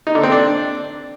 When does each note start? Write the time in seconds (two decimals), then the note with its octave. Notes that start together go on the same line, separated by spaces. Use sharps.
0.07 D#4
0.15 D3
0.23 C4
0.32 D4